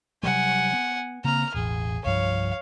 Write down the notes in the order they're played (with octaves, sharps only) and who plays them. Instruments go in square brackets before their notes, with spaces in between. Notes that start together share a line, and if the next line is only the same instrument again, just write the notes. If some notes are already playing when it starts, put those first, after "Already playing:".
[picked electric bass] C3 F#3 G3 [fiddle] F#5 G#5
[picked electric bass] B3
[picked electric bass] C#3 A#3 C4 [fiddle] A#5 F6
[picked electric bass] E1 A1 [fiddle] G#4
[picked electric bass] C2 G2 F3 [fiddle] C#5 F5